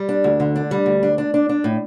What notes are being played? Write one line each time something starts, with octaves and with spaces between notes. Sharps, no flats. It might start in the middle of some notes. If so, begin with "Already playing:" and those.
Already playing: G3
D4
D2
D3
D4
G3
D2
D4
D4
D4
D4
A2